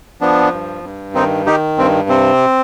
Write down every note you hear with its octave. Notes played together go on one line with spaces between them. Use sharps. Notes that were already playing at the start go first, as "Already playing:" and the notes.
F3 B3 D4
G2
G2
D#3 C4 D#4
D#3 D#4 G4
G2 C4
C3 C4